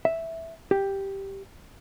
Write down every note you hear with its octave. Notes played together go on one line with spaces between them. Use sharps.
E5
G4